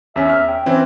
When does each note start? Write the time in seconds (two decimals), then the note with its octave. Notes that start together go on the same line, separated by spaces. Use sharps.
0.16 E2 C#4 E5
0.30 F6
0.48 G5
0.66 E3 C4 C#4